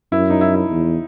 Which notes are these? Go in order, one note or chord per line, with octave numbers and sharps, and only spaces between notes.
F#2 E4
D#4
E4
E4
E2